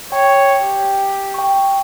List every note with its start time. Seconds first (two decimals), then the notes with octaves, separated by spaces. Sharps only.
0.12 C#5 G5
0.62 G4
1.34 G5 C#6